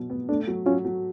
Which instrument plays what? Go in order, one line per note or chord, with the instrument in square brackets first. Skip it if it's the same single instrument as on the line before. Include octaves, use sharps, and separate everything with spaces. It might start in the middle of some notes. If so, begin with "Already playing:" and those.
Already playing: [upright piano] B2 F#3
B3
[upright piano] A3 [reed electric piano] D4
[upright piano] F#3
[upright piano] F#3 [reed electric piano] C#4 F4
[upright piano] F#3